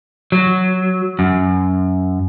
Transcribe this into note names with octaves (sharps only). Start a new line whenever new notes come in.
F#3
F#2